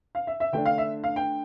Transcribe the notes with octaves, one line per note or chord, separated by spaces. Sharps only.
F5
E5
E5
D3 A3 D4 G5
F5
E5
F5
G5